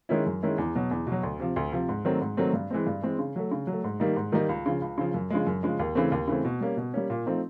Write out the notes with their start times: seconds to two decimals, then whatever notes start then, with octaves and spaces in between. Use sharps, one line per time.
0.09 D#3 G#3 C#4 E4
0.26 F#2
0.43 D#3 G#3 C#4 E4
0.58 E2
0.75 B2 F#3
0.91 E2
1.07 B2
1.12 F#3
1.23 D2
1.40 C3 F3
1.56 D2
1.72 C3 F3
1.89 G#2
2.05 D#3 F#3 A3 C4
2.21 G#2
2.37 D#3 F#3 A3 C4
2.53 G2
2.70 E3 G#3 C4
2.87 G2
3.02 E3 G#3 C4
3.19 C#3
3.36 F#3 A3
3.51 C#3
3.67 F#3
3.73 A3
3.84 G#2
4.00 D#3 G3 A#3 D#4
4.16 G#2
4.32 D#3 G3 A#3 D#4
4.49 C#2
4.66 C#3 F3
4.82 C#2
4.98 C#3 F3
5.14 F#2
5.30 C#3 F3 G#3
5.47 F#2
5.63 C#3 F3 G#3
5.79 D#2
5.95 C#3 E3 A3 C4
6.12 D#2
6.28 C#3 E3 A3 C4
6.45 B2
6.61 G3 A#3 C#4
6.77 B2
6.94 G3 A#3 C#4
7.10 A#2
7.26 F3 A3 C4 D#4